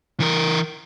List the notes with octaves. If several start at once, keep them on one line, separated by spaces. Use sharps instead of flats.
E3 A#4